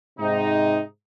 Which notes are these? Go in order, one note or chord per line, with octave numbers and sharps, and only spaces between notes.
G#2 C3 D#4